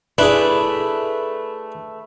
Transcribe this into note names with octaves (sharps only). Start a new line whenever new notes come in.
A3 D4 E4 G#4 B4